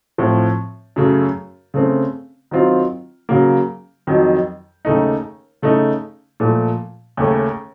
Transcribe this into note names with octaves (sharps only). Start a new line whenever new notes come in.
A2 F3 C4
F#2 C#3 A3
C#3 A3 C4
D#3 F#3 C4 F4
C#3 F#3 A#3
F2 D#3 F#3
D#2 C#3 A3 D#4
C#3 A3 D#4
A#2 F3 A3
D#2 C#3 A3 C#4